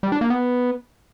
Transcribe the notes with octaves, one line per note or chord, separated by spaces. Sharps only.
G3
D4
A#3
B3